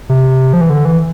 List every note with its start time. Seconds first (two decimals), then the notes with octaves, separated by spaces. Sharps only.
0.09 C3
0.53 F3
0.61 E3
0.70 D3
0.85 E3